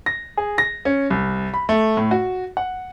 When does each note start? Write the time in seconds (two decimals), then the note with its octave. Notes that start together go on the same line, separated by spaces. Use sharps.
0.06 A#6
0.37 G#4
0.58 A#6
0.85 C#4
1.10 C2
1.54 B5
1.69 A3
1.97 A2
2.11 F#4
2.57 F#5